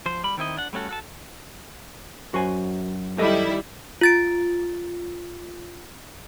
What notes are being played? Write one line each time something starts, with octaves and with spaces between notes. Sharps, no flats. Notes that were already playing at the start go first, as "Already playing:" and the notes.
F3 C5
G3 B5
D#3 C4 E4 D#5
D4 F#5
G3 A3 C#4 F#4 A4
F#4 A4 A5
F#2 F#4 C5 G#5
D#3 G3 E4 G4 A4 D#5
F4 A6 D7